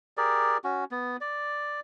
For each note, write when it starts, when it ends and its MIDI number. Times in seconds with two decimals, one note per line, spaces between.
0.17 0.57 67
0.17 0.57 68
0.17 0.57 70
0.17 0.57 74
0.64 0.84 61
0.64 0.84 66
0.91 1.17 59
1.21 1.80 74